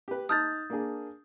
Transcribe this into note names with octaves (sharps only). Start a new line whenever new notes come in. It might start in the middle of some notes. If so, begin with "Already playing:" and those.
G4 B4
D#4 A5 D#6 F6 G6 A6
A#3 D4 G#4